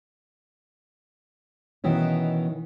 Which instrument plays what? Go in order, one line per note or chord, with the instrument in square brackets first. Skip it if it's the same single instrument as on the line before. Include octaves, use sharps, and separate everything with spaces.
[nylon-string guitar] B2 D#3 E3 B3 C#4